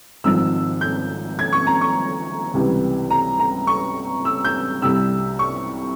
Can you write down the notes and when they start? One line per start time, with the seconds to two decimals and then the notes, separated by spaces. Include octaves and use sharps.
0.24 G#1 G#2 F3 E6
0.81 G6
1.39 G#6
1.53 C#6
1.67 A#5
1.81 C#6
2.53 C#2 C3 E3 G3
3.10 A#5
3.40 A#5
3.67 C#6
4.25 E6
4.45 G6
4.82 C2 C3 G3 E6
5.39 C#6